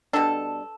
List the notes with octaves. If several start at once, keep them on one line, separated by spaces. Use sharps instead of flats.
B2 G3 D4 A4